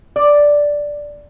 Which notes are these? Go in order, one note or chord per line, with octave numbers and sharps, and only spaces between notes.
D5